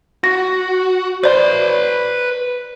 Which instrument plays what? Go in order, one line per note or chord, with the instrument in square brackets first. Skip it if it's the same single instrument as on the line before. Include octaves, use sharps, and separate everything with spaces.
[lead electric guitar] F#4 [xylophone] A#6
[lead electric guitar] B4 C6 [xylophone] C5 D5